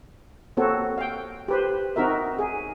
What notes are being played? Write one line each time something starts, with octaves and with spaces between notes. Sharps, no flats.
A#3 C4 F#4 A4 C#5
F5 G5
G4 B4 C5
C4 D#4 F#4 A#4 E5
G#4